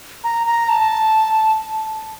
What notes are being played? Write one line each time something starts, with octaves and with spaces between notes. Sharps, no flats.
A#5
A#5
A5